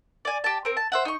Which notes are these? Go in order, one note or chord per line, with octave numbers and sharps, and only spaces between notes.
D5 G#5
G4 A5
C4 A#4
A5
C5 E5 F#5
D#4 C#6